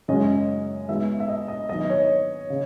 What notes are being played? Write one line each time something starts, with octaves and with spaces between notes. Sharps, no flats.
F#2 C#3 G#3 C#4 F#4 D#5
G#3 B3 D#4 F#4 E5
E5
D#5
D#5
D#3 F#3 B3 D#4 D#5
C#5
C#3